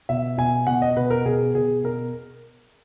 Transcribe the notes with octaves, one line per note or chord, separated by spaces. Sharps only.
B2 E5
B2 G#5
B2 F#5
D#5
B2 B4
A#4
B2 G#4
B2 G#4
B2 A#4